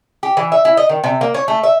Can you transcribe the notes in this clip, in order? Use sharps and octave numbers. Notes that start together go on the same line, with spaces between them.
G4
E3
E5
E4
D#5
D#3
C3
A#3
C#5
A3
E5